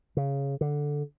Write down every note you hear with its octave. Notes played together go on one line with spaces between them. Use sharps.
C#3
D3